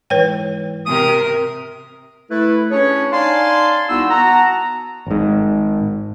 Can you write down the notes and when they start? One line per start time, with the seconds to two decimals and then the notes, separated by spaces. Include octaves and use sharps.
0.10 G#2 E3 B4 C#5 G5
0.86 C3 A#4 D#6
2.30 A3 E4 A4 B4
2.71 C#4 D4 G#4 B4 C#5
3.13 D#4 D5 F5 G#5 A5 C6
3.89 C2 B3 D#4 E4 F#4 E6
4.10 B3 F#4 F#5 A5 A#5
5.07 G#1 G#2